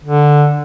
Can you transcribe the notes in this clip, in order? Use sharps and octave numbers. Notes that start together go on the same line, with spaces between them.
D3